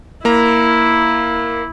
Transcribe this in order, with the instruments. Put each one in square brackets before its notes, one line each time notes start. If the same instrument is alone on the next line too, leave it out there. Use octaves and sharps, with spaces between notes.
[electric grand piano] A#3 A#5 [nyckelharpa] E4